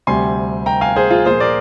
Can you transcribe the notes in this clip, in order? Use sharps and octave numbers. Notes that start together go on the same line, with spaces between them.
D2 C3 G3 G#5 C6
G5 A#5
F5 G#5
G#4 C5
F4 G#4
A#2 F3 A#3 G#4 C5
A#4 D5